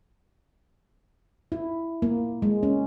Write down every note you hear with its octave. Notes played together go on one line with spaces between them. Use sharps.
E4
A#3
G#3
C#4